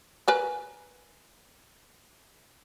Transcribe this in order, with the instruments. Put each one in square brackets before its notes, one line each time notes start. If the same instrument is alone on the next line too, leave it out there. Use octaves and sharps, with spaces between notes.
[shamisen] A#4 B4 G#5